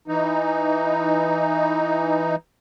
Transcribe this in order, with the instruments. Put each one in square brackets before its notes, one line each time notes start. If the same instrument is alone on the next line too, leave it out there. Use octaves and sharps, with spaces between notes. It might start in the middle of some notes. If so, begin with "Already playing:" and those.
[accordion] E3 D#4